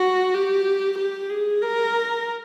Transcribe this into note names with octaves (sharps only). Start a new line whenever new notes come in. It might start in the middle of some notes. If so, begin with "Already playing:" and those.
Already playing: F#4
G4
G4
G#4
A#4